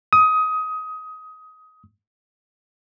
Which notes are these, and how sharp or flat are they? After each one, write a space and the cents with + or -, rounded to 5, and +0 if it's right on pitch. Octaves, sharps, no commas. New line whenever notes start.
D#6 +20